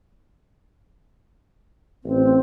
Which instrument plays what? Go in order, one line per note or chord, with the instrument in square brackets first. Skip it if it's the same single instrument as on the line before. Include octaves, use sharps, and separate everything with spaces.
[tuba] A1 [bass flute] C4